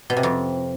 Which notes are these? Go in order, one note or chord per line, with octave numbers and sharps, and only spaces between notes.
B2
C3
F2